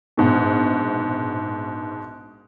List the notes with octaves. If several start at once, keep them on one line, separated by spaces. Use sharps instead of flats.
A#1 G#2 B2